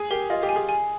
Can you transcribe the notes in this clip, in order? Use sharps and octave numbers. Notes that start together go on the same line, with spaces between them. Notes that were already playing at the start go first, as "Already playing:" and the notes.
Already playing: G#4 G#5
G4 A#4
F4 D#5
G4
G#5
G#4
G#5